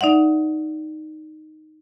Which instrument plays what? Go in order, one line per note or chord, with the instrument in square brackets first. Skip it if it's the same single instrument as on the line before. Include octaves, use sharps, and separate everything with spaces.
[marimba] D#4 D5 E5 F#5